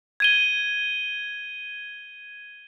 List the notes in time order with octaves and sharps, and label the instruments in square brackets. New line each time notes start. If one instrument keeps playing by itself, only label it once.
[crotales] G#6 D#7 G7